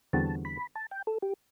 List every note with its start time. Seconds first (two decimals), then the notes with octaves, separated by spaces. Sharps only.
0.13 E2 D3 G3 C4 F#4 A5
0.45 B5
0.75 A5
0.91 G5
1.07 A4
1.22 G4